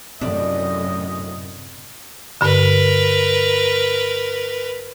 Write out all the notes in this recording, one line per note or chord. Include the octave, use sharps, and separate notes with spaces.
F#2 A2 C3 D4 D#5
G2 D3 A#4 B4